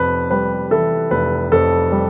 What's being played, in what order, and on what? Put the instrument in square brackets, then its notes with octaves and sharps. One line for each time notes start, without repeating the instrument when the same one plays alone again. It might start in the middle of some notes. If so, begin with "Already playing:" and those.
Already playing: [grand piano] F1 F2 B4
G3 B4
E3 A4
F1 B4
F2 A4
G3